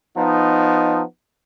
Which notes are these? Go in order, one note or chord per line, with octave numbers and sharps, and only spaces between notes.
F3 B3 D#4